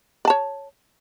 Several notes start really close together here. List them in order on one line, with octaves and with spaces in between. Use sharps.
D5 A5 C#5